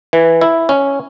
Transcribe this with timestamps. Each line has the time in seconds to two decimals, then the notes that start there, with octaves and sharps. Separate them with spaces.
0.13 E3
0.41 E4
0.69 C#4